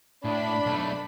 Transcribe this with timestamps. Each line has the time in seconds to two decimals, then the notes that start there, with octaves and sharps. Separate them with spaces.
0.25 A2 D4 B5
0.66 B1 A3